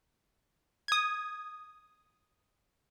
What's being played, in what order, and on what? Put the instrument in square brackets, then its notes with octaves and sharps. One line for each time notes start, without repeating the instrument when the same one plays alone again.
[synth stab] D#6 G#6